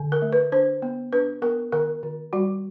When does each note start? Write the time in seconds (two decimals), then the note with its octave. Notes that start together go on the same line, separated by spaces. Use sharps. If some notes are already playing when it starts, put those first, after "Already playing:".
Already playing: D3
0.12 A#4
0.22 A3
0.33 B4
0.52 D4 C5
0.82 B3
1.13 D4 B4
1.42 B3 A#4
1.72 D#3 A#4
2.03 D#3
2.33 G3 F#4